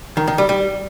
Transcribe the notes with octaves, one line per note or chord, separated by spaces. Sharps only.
D#3
D#3
G3
G3